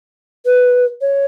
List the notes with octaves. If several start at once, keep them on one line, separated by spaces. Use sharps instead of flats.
B4
C#5